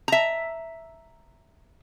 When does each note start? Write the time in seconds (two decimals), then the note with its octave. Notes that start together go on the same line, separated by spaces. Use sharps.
0.08 E5 A#5